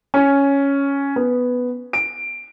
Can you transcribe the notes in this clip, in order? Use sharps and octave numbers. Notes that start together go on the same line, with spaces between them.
C#4
B3
D7